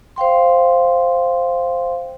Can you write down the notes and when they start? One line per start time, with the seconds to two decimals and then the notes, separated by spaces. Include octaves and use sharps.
0.16 C5 F5 G5 C6